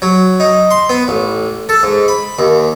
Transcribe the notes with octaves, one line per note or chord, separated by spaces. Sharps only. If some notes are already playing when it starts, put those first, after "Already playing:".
F#3
D#4
C6
B3
A1
A4
G#2
B5
D#2